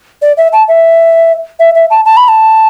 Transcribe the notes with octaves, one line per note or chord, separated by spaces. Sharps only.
D5
E5
A5
E5
E5
E5
A5
A5
B5
A5